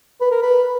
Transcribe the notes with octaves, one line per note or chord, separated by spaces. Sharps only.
B4
A#4
B4